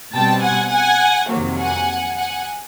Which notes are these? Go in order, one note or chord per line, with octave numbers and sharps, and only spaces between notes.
B2 G3 C4 G5 A5
F#5 G#5
F#5 G#5
F2 C3 D#3 F#3 A#3
F#5 G#5
F#5 G#5